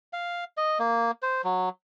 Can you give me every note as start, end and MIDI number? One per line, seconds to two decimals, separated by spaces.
0.13 0.44 77
0.57 0.78 75
0.79 1.11 58
1.22 1.42 72
1.44 1.69 54